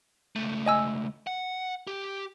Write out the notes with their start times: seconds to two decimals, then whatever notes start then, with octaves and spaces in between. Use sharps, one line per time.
0.36 C#2 A3
0.66 D#5 G#5 E6
1.27 F#5
1.87 G4